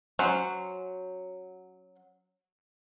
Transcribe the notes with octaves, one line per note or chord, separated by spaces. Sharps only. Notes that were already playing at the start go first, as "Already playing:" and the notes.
F#3 C#4 C5 F#5